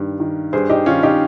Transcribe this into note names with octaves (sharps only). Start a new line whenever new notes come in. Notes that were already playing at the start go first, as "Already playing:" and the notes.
Already playing: G2 D#3
D#3
G2 G#4 C5
D#4 G4
D#3 C#4 F4
D#4 G4